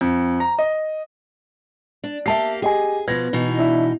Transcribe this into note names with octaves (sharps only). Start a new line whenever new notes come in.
F2
A#5
D#5
D4
A#3 G4 E5 A5 C7
G4 G#4 D#5 G#5
B2 F3 B4 G#6 A#6
B2 E3 D#4
D4 E4 E5